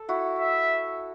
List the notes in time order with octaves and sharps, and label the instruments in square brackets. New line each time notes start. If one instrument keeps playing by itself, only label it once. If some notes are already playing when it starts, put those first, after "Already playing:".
Already playing: [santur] A4
E4 F#4
[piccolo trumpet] E5